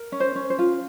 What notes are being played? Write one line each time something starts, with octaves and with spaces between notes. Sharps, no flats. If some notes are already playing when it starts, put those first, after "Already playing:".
Already playing: A#4
C#4
C5
C#4
C5
F4